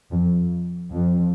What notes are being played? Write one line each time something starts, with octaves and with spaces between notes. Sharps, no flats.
F2
F2